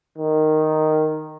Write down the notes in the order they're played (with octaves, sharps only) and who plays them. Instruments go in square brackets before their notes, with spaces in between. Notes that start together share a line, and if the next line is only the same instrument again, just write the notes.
[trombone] D#3